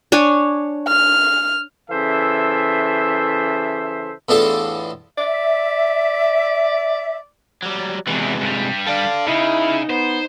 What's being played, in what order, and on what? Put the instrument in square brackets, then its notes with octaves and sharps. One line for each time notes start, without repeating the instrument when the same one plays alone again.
[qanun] D4 C#5 G#5
[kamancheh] F6
[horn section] C#3 E3 A4 C5 E5
[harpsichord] E2 A2 D4 F4 A4
[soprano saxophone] D5 [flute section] E5
[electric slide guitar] F#3 G3
[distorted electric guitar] E2 E3 [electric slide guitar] C3 G#3 F#4
[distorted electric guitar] G2 G3
[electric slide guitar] A4 D5 [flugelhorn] F5
[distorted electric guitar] C#3 [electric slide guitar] D#4 [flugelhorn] E4
[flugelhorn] B3 [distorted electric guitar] C5